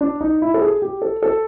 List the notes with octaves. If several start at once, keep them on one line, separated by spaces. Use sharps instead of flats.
D4
D#4
E4
A4
G#4
G4
A4
A4